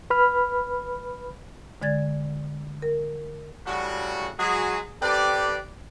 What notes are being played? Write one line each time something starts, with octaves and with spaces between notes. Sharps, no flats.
B4 B5 F6
D3 G#3 D5 G#6 A6
A#4
A2 C#3 G3 F#4
F#3 G#3 F#4 G#4
C4 G4 A4 B4 D5